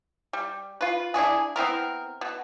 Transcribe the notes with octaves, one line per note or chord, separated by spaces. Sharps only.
G3
F4 B4
D4 E4 F#4 G#4
B3 C4 E4 A#4
B2